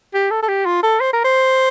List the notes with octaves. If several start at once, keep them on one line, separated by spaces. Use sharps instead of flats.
G4
A4
A4
G4
F4
A4
C5
A#4
C5